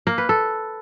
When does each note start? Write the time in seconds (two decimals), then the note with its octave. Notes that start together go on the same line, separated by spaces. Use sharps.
0.07 A#3
0.18 B4
0.29 A4